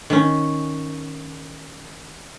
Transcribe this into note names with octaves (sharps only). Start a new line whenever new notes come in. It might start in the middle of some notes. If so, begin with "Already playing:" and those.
D#3 C#4